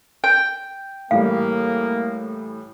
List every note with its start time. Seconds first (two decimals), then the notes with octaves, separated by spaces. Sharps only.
0.24 G5
1.11 A2 E3 G3 A#3 F5